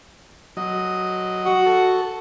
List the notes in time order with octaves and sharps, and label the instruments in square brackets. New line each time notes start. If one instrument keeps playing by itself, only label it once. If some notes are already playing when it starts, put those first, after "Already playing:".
[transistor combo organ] F#3 D#5
[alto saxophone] F#4
[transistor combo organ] A4